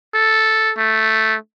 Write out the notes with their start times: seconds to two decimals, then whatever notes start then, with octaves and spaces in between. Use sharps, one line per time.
0.14 A4
0.78 A3